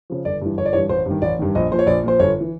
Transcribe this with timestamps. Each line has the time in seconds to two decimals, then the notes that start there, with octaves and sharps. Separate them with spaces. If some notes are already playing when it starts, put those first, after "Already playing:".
0.10 C#3 F3
0.25 G1 D5
0.41 G2 E3
0.58 G1 C#5
0.65 D5
0.73 G2 E3 C#5
0.89 A1 C5
1.06 G2 D#3
1.22 A1 D5
1.39 G2 D#3
1.55 A#1 D#5
1.71 A#2 F3 C5
1.79 C#5
1.86 A#1 D5
2.03 A#2 F3 C5
2.19 G1 C#5
2.41 E3